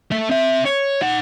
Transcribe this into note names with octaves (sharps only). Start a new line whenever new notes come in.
A4 E5
C4 E5
C#5
D#4 F#5